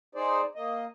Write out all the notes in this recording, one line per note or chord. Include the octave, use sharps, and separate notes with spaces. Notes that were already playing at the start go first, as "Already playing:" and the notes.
D#4 G#4 C5 D5
A#3 D#5